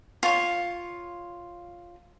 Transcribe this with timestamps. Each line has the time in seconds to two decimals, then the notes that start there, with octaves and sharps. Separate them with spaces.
0.23 F4 C#5